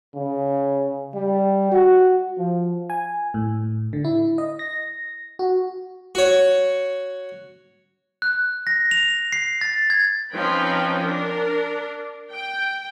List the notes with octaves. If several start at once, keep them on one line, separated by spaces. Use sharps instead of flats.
C#3
G3
F#4
F3
G#5
A2
D3
E4
D#5
A#6
F#4
F#4 C#5
F#6
A#6
F7
C7
A6
G#6
F3 C4 C#4 D#4 B4 G5
D4 A#4
G5